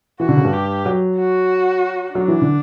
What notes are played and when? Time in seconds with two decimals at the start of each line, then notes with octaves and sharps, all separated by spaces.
0.20 E3 F#4
0.29 D3
0.37 C#3
0.45 G2
0.53 G4
0.86 F#3
1.18 F#4
2.14 F#3 D4
2.28 E3
2.41 D3